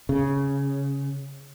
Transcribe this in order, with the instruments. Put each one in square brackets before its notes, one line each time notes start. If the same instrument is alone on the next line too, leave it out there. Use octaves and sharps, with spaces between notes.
[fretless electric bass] C#3